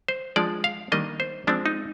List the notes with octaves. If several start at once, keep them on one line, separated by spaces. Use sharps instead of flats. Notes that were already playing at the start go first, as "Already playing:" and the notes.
C5
F3 G#3 D4 D5
F5
D#3 G3 A#3 D4 D#5
C5
F3 G#3 C4 D4
D#4